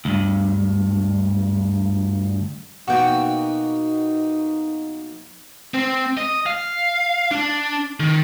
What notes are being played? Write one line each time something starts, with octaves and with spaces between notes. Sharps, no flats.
D2 G2
B2 A#3 B3 D#4 F#4 G5
C4
D#5
F5
D4
D#3